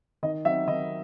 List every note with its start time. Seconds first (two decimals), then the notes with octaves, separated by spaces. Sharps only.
0.23 D#3 D#5
0.45 F#3 C4 D#4 E5
0.67 D#3 D#5